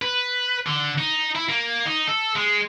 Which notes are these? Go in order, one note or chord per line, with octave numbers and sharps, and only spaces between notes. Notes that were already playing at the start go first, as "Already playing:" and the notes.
B4
D3
D#4
E4
A#3
D#4
A4
G#3